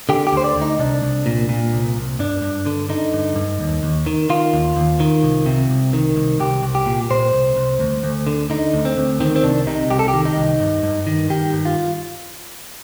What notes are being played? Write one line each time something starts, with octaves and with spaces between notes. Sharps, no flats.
D3 G4
G4
D2 C5
D5
D2
D#4
C2 D4
C2
A#2
A#2
C2
C2
G2 D4
G2
D3
D3 D#4
G2
G2
D#2
D#2
D#3
D#3 F4
D#2
D#2
D#3
C2
C3
C2
D#3
C2
C2 G4
C2
G4
A#2
A#2 C5
C2
C2
D2
D2
D3
D3 D#4
D2
C4
D2
D#3 C4
C4
C2 D4
C3 D#4
C2 G4
A4
G4
D#3
D#4
C2
G2
G2
D#3
D#3 G4
G2
F4